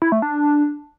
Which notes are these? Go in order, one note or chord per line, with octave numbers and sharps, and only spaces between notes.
E4
A3
D4